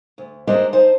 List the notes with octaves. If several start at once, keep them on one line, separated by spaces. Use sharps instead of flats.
D2
G#3 D4 G4 A#4 C5 D#5
D#4 C5 A5